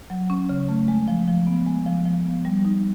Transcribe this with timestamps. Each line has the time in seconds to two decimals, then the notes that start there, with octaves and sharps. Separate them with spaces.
0.10 F#3
0.30 C#4
0.49 C#3
0.69 A3
0.88 G#3
1.08 F3
1.28 F3
1.47 B3
1.67 G#3
1.86 F3
2.06 F3
2.25 B3
2.45 G3
2.65 D#4